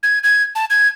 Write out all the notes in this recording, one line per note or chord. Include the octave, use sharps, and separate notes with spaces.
G#6
G#6
A5
G#6